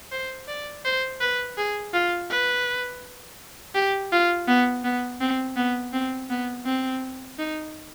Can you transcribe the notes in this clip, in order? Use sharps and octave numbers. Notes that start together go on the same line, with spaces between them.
C5
D5
C5
B4
G#4
F4
B4
G4
F4
B3
B3
C4
B3
C4
B3
C4
D#4